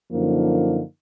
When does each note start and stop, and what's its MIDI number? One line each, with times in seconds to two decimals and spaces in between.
0.12 0.81 42
0.12 0.81 50
0.12 0.81 53
0.12 0.81 58
0.12 0.81 63